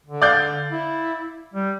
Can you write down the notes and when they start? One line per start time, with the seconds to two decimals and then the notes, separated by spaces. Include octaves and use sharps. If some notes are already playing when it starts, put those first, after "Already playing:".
0.07 D3
0.22 D5 F5 G6
0.72 E4
1.54 G3